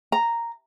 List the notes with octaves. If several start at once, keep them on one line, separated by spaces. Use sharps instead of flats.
A#5